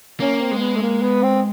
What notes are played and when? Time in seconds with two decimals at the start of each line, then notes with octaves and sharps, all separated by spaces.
0.20 A#3 C#4
0.41 C4
0.51 G#3
0.57 A#3
0.61 B3
0.76 A3
0.82 A#3
1.02 B3
1.23 C4